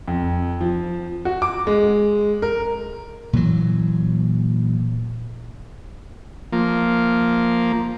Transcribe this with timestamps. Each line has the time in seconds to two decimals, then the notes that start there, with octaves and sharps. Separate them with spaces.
0.08 F2
0.61 F3
1.25 F#4
1.42 D6
1.67 G#3
2.42 A#4
3.33 A#2 E3 F#3
6.52 F3 A#3